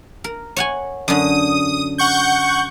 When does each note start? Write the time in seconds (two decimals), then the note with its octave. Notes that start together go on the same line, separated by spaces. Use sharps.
0.24 A#4
0.56 C#5 F#5 G#5
1.08 F#2 D3 D#6
1.98 F#5 C#6 G6